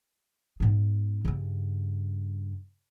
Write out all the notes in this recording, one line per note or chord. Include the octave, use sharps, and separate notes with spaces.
G#2 B3
G2 C#3